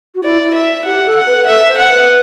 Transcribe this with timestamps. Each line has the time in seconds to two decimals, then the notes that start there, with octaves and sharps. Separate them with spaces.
0.15 F#4
0.23 E4 D5
0.44 E4
0.55 E5
0.85 G4 F#5
1.06 A4
1.16 F#5
1.26 B4
1.37 B4
1.46 A4 E5
1.67 C5
1.78 F#5
1.88 B4